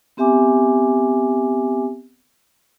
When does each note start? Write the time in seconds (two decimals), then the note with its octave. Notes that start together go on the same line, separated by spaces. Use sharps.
0.17 B3 C4 G4 E5 G#5 D6